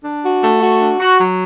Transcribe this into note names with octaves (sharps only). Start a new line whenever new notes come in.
D4
F#4
A3
F#4
D4
F#4
F#3